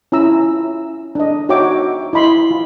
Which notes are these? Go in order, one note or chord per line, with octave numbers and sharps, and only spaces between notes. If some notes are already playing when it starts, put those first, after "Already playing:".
C#4 E4 F4 A#5 E6
D4 D#5
D#4 F#4 C#5 E5 G5 D6
E4 D#5 B5 C6
F4